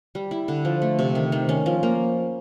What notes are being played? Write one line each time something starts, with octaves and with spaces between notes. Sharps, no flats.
G3
E4
D3
F3
A3
C3
D#3
D#3
C#4
F3
A#3